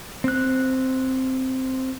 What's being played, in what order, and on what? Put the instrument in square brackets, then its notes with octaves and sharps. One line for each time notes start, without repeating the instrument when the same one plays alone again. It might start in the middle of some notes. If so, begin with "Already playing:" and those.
[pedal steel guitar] C4 F#6